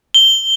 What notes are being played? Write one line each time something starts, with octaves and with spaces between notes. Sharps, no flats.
G7